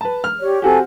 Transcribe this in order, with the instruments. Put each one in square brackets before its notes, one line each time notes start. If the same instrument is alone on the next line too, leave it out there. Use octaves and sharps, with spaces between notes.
[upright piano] B4 A5
F6
[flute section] G4 C#5 D5
[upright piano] C4 F#4 G4 [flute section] A4 G#5